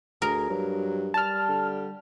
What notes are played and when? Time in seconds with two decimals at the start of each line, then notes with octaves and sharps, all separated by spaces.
0.22 D2 G#4 A#4
0.49 G2 F#3
1.14 G3 A5 F6
1.48 D3